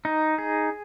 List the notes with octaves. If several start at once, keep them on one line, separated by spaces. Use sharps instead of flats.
D#4
G#4